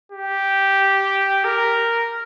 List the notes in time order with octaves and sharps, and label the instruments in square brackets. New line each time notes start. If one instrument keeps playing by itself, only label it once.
[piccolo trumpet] G4
A#4